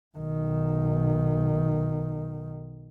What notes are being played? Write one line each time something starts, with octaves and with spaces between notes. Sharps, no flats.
B1 D#3